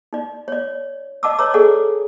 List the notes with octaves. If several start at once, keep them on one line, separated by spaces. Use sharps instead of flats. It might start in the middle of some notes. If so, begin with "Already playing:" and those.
D#4 D5
C#5 D5
D5 D#5 F#5 A5 D6 E6
B4 C#5 D#5 A#5 D6 E6
G#4 A4 D5 F#5 G#5